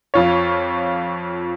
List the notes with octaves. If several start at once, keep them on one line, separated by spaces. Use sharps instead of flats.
F2 F4 C#5